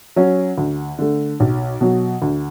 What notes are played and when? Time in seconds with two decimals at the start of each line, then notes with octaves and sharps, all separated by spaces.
0.16 F#3 C#4
0.58 D2
0.99 D3 A3
1.40 B1
1.81 B2 F#3
2.22 D2